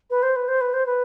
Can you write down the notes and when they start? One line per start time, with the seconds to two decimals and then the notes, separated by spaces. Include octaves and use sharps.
0.10 B4
0.23 C5
0.36 B4
0.48 C5
0.61 B4
0.73 C5
0.86 B4